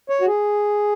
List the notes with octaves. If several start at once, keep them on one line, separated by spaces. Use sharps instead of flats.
C#5
F#4
G#4